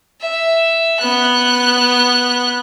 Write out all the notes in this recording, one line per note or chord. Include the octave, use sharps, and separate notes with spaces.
E5
B3 F#6